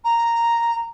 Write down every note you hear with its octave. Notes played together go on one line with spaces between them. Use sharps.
A#5